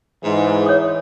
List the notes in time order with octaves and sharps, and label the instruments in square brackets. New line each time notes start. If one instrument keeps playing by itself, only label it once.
[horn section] G#2 [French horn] E3
[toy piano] C#5 D#6